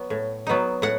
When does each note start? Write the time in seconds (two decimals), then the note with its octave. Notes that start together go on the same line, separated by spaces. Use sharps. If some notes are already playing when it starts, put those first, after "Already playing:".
Already playing: F#3 B3
0.10 A2
0.47 F#3 B3 D#4
0.82 A2 F#5